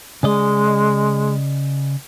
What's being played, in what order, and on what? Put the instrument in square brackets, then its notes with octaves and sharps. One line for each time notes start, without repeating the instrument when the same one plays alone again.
[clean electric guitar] C#3 D5 D#5 [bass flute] G#3